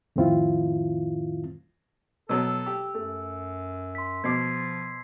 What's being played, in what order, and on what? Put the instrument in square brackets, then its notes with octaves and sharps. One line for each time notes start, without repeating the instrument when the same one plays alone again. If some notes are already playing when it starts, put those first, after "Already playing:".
[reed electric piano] F2 A2 D#3 C4 E4 F4
[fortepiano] B2 F#3 [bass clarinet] A4 [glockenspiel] E6
[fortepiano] G4
[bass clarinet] F#2 [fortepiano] A3
[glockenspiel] C6 B6
[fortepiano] B2 D6 [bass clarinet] F3 [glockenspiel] G#6 C7